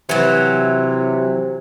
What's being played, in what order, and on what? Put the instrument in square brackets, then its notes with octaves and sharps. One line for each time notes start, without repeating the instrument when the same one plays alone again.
[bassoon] C3 [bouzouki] E3 F#3